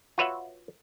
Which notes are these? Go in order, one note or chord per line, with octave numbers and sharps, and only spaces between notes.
F4 F#4 B4 C#5 E5 F#5